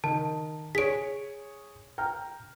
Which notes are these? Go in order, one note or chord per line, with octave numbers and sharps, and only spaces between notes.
D#3 A5
G#4 C#5 B6 D7
G5 A#5 F6